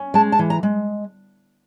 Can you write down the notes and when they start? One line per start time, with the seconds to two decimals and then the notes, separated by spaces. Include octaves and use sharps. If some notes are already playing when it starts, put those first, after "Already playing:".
Already playing: C#4
0.14 G#3 A5
0.32 A5
0.39 E3
0.50 A#5
0.63 G#3